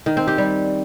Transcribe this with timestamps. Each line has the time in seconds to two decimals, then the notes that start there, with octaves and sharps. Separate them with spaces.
0.06 D#3
0.17 C4
0.28 G4
0.38 G3